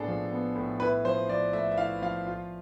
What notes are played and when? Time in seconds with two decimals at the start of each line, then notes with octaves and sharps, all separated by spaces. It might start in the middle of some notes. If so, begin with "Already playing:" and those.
Already playing: A2 B3 D4 G#4 A4
0.08 F3
0.32 B3
0.55 A2
0.80 E4 B4
1.05 F3 C5
1.29 F3 D5
1.53 A3 E5
1.72 E5
1.78 E4 F5
2.02 F3 F5
2.27 F4